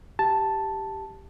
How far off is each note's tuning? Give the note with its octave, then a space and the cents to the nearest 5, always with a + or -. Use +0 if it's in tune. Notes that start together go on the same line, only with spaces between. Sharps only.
G4 +0 A5 +0